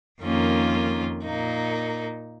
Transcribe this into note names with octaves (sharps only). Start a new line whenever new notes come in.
F2 D#3 A#3 C#4 F4
A#2 A#3 D#4